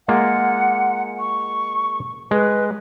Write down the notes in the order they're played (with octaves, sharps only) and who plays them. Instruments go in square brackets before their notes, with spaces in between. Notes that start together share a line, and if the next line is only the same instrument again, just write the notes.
[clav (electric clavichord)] G#3 A#3 F4 [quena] F#5
[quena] C#6
[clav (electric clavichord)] G#3 [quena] B4